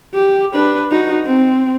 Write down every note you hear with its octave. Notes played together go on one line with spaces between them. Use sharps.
G4
D4 B4
D#4 F#4
C4